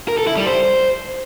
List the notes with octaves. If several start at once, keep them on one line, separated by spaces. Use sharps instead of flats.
A#4
A4
E4
G3
C5